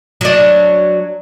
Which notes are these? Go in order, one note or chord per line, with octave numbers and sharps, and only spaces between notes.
F#3 D4